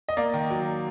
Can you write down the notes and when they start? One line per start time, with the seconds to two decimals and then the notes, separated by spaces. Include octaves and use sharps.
0.08 D#5
0.17 A#3 D5
0.34 D#3
0.50 F#3